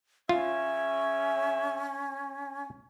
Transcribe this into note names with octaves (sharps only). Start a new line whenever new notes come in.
C#3 C#4 F4 E5